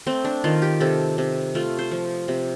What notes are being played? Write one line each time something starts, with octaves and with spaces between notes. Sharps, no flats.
A3 C4
D4
D#3 F4
G4
C3 A4
C3
A3 F4
C5
F3
C3